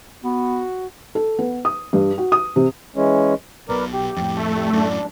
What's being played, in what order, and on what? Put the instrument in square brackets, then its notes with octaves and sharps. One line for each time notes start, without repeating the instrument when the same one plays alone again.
[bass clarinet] B3 [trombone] F#4
[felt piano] A4
B3
D#6
G2
F#4
D#6
C3
[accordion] E3 G#3 C#4
[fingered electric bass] B1 B2 [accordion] A#4 B4 D5
[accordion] G4
[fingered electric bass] F2 A2
[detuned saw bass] A3
[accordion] G3
[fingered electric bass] F#2 A2 [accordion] D4